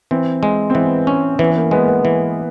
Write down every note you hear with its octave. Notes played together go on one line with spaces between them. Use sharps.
E3 C4
G#3
C4
E3 B3
C#4
E3 B3
B3
A#3
G#3 B3
A#3
B3
E3